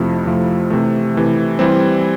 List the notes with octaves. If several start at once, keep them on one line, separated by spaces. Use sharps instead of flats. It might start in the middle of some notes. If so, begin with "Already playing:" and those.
Already playing: F2 C3 F3 A3 E4
F2 C3 F3 A3 E4
C3 E3 A3
C3 E3 A3
E3 G3 C4